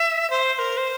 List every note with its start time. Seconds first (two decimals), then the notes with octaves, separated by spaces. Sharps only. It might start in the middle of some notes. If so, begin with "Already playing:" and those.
Already playing: E5
0.30 C5
0.54 C5
0.59 A#4
0.77 C5